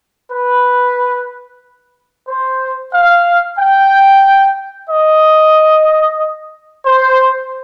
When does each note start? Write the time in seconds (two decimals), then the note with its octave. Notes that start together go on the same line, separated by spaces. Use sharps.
0.32 B4
2.28 C5
2.94 F5
3.59 G5
4.90 D#5
6.86 C5